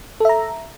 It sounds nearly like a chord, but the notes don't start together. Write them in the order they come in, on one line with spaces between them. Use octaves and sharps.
A4 E5 A#5